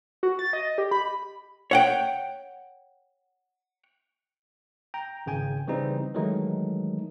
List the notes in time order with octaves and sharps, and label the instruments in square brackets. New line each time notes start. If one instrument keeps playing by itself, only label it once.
[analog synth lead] F#4
A6
D#5
G4
B5
[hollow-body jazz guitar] C#5 F#5 G5
[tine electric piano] G5 A#5
G#1 C#3 G5 G#5
C#3 E3 G3 C4 D#4
D#3 E3 F#3 G#3 A3 D#4